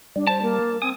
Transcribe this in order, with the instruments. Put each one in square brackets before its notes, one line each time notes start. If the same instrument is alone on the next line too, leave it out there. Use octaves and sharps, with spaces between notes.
[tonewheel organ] G3 [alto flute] D4
[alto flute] C5 [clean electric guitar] A5
[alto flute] A#3
[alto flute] C4 [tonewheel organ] G#5 D#6